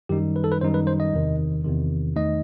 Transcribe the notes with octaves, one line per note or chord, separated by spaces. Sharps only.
F#2 D#3 G3 D#4 G4
B4
A4
B4
F#2 D#3 G3 D#4 C5
B4
C5
D#5
E2 C3 D#3
E2 C3 D#3
E2 D#3 A3 D#4 D#5